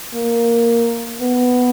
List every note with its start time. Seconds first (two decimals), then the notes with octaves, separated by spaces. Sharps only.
0.14 A#3
1.21 B3